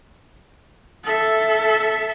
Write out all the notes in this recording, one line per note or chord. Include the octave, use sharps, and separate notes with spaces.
A4 E5